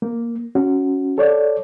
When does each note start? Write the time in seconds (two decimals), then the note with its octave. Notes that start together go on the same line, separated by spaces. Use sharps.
0.02 A#3
0.55 C#4 F#4
1.18 A4 C#5 D5